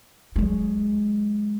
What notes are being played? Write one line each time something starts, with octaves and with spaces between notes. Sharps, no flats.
F#3 G#3